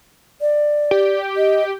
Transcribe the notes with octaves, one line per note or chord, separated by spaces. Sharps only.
D5
G4
D#5